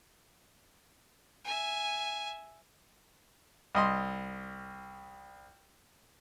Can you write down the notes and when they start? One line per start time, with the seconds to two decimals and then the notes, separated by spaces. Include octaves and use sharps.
1.44 E5 G#5
3.75 C2 D#5 C6